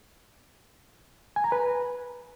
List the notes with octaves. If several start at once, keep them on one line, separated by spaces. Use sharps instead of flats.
G#5
A#5
B4